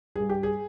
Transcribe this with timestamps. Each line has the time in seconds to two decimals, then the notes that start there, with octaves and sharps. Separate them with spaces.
0.16 G2 G3 G#4
0.29 G4
0.43 G#4